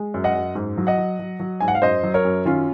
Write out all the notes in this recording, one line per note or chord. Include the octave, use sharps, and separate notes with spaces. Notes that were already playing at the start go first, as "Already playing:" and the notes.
Already playing: G#3
F#2
D#5 F#5
F#2
G#2
F#3
D#5 F#5
F#3
F#3
F#3
G#2 G#5
F#5
F5
F#2 C5 D#5
F#3
A#4 C#5
F#2
D#3 C#4 F4